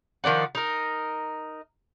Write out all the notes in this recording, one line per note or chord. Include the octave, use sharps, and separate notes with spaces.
D#3 F3 D4 F#5
D#4 A#4